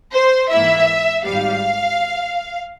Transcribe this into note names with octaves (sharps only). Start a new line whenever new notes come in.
C5
G#2 E3 A#3 E4 E5
G#1 G#2 G3 F5